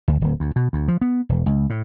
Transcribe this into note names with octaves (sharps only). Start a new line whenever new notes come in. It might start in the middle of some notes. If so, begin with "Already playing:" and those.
D2
D1
D2
B2
D2
F3
B3
E1
C#2
A2